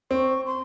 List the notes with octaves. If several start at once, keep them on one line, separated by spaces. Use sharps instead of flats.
C4 C#6
C6